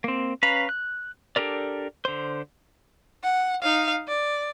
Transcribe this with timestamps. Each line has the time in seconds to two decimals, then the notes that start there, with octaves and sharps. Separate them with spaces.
0.04 A#3 C4
0.43 C#4 B4 F5 A#5 B5
0.69 F#6
1.36 D4 G4 A4 A#4 D5
2.05 D3 C5
3.23 F#5
3.63 D#4 F5
4.08 D5